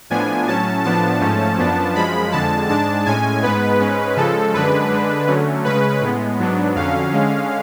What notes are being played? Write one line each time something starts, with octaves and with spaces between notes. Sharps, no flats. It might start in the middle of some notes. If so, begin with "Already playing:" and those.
A2 F3 B3 D4 G#5
A2 F#3 C#4 A5
A2 F3 B3 D4 A5
G#2 F3 A3 C#4
F#2 F3 B3 D4
F#2 F3 G#3 B5
F2 D3 G#3 A5
G#2 G#3 D4 A5
A2 G#3 C#4 G#5
G#2 G#3 B3 B4
G#2 G#3 C#4
C#3 F3 G#3 A4
F#2 D3 G#3 D4 B4
D3 G#3 D4
D3 F#3 A3 C#4
C#3 G#3 C#4 B4
A2 G#3 B3
G#2 F#3 B3 D4
F2 D3 F#3 C#4 F5
D3 G#3 C#4